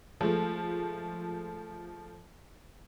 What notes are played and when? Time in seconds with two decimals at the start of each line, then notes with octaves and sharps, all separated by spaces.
0.21 F3 G#3 A3